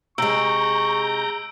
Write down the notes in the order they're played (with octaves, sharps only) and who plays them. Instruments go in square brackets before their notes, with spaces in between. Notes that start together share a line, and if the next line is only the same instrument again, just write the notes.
[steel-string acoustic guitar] C3 G#3 [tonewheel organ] A#5 G6 [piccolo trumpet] C#6 [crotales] E6 D7